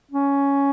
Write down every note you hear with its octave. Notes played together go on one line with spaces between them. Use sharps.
C#4